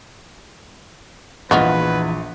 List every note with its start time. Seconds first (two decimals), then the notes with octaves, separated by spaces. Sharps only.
1.51 A#1 E2 F3 D#4 F4 F#4 B4